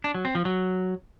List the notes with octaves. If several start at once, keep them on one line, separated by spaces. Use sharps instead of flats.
D4
F#3
C4
F3
F#3